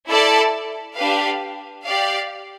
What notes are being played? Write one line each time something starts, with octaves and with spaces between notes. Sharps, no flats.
E4 A4 D5 A5
D4 G4 B4 F5
G4 D5 F5